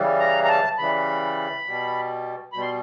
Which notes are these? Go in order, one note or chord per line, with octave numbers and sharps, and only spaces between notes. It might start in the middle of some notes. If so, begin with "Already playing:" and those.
Already playing: C#3 E3 G3
A#5
A#5
A5
C#3 E3 G3 B5
B2 G3
B2 G3 B5
C6